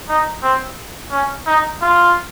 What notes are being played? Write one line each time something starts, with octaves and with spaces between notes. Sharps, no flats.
D#4
C4
C#4
D#4
F4